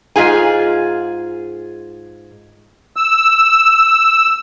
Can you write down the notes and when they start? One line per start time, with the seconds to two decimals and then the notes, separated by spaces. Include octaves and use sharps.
0.16 G#2 F4 G#4 G#5
2.96 E6